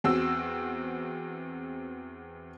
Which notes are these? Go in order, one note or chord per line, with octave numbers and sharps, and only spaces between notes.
E2 C4 F#4 E6